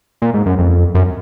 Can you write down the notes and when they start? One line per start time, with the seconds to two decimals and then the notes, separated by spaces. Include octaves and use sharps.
0.22 A#2
0.34 G#2
0.46 F#2
0.59 F2
0.95 F#2